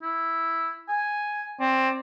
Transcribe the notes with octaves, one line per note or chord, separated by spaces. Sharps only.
E4
G#5
C4 D5